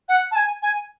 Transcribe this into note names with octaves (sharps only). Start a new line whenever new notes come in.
F#5
A5
G#5
G#5